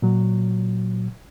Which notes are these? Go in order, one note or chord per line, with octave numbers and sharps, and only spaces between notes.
A#2 F#3